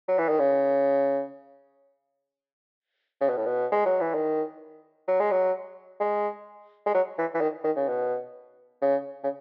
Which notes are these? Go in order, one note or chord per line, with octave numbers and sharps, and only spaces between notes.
F#3
E3
D#3
C#3
C#3
B2
A2
B2
G#3
F#3
E3
D#3
F#3
G#3
F#3
G#3
G#3
F#3
E3
E3
D#3
D#3
C#3
B2
C#3
C#3